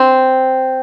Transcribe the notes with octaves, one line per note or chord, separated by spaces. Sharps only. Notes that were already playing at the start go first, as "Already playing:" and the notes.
Already playing: C4